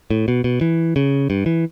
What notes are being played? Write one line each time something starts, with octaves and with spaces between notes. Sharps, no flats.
A2
B2
B2
E3
C#3
G2
E3